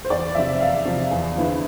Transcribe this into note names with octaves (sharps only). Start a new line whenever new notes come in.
C5
E2 D5
C3 F3 E5
E2 F5
C3 F3
E2
D3 F3 B3 E4